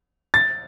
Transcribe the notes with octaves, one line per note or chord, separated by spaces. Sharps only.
A6